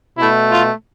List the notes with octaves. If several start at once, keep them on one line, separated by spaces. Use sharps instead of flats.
B2 A3 E4
F4